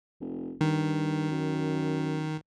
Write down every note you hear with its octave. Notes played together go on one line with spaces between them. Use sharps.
F1
G2 D#3
F#2